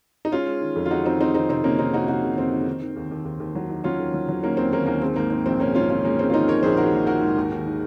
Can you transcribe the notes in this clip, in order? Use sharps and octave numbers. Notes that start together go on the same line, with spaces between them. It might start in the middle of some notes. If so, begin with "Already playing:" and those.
D#4
G#3 C#4 F4
G#3
D#3
F2
F4
G#3 D#4 F#4
D#3 C4 D#4
G#3 C4 D#4
D#3 C4 D#4
C3 C4 D#4
C3 A#3 C#4
C3 C4 D#4
D#3 D#4 F#4
C3 D#4 F#4
C3
F2 C4
D#3
D#3
D#3
D#2
D#2
D#2
D#2
F#3
D#3
F#3 C#4 F4
D#2
F#3
F#3
D#3 A#3 C#4
D#2 C4
D#2 A#3 C#4
D#2 A#3
G#3 C4
G#2 A#3
D#3 C4
A#1 C4
G#2 A#3 C#4
G#2 C#4 F4
D#3 C#4 F4
G#3 A#3 C#4
G#3 C4
F4
D#3 C4 D#4
G#3 A#4 C#5
A#1 G#4 C5
D#3 F#4 A#4
A#1
D#3 F#4 A#4
G#2
D#2
D#2
D#3